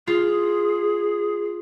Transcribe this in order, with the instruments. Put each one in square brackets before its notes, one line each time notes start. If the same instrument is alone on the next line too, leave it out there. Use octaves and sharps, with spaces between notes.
[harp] F4 [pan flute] G#4